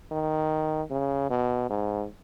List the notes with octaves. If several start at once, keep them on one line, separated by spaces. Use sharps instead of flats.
D#3
C#3
B2
G#2